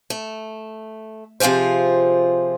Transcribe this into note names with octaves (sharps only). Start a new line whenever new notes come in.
A3
C3 F3 F4 G#4 C5